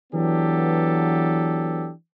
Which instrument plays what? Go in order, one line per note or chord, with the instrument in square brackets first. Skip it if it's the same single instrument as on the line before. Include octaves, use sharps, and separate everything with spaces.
[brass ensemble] E3 F#3 B3 D4 G4 A4